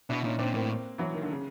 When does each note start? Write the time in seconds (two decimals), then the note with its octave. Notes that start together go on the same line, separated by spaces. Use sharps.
0.09 B2 D4 E4
0.24 A#2 C#4 D#4
0.38 A#2 C4 D4
0.54 A2 A#3 C4
0.98 E3 F#3
1.14 D#3
1.22 D3
1.32 C#3